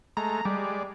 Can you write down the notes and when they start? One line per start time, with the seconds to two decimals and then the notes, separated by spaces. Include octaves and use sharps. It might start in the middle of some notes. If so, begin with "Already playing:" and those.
0.17 G#3 A3 A#5
0.45 G3 G#3 D5